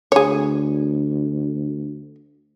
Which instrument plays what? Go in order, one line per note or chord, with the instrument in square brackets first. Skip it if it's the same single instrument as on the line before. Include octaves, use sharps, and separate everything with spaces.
[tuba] D2 [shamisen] G#4 C#5